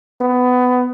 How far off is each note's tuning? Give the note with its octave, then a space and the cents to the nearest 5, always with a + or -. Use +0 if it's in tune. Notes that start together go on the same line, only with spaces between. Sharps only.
B3 +20